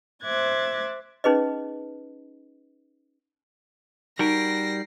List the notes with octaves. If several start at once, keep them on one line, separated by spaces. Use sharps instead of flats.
C5 E5 D6 F#6 G#6 A6
C#4 D#4 G#4 B4 D#5
G3 D#4 F#4 A#4 A#6 C7 D7